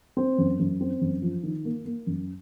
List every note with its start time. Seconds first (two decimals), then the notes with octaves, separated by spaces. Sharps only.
0.17 C4
0.38 F#2
0.59 F#2
0.81 C4
1.01 F#2
1.22 F3
1.43 D#3
1.65 A#3
1.85 A#3
2.07 F#2